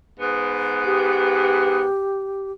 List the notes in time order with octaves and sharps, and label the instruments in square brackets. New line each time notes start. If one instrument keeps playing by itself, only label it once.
[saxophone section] G#2 B3
[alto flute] G4